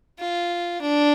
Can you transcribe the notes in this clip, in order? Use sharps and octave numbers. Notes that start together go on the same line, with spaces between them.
F4
D4